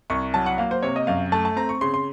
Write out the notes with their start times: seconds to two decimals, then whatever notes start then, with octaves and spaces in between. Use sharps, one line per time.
0.10 C2 C#6
0.34 F#3 A5
0.46 F#5
0.58 A#3 F5
0.71 C5
0.83 C3 C#5
0.96 D#5
1.07 F#2 F5
1.32 A3 A5
1.45 A5
1.56 C4 A#5
1.69 C#6
1.81 C#3 C6
1.94 C6